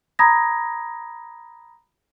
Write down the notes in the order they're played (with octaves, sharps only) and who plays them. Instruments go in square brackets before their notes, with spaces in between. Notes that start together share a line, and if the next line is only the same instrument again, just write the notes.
[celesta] A#5 B5 D#6 G#6 A#6